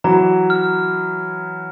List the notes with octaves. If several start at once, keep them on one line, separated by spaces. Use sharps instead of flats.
E3 F#3 A#5
F6